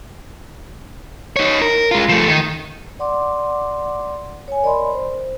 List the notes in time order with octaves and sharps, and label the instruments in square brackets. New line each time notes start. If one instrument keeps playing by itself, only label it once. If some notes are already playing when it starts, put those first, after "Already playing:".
[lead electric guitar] D#4 C#5
A#4
G#3 F4
F3 A3
D#3
[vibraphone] D5 F#5 C6 D6
C#5 G#5
A#4 D5 D#5 B5 C6
C5